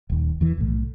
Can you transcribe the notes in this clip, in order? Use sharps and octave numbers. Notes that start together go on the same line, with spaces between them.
D#1 D#2
E2 E3
B1 A2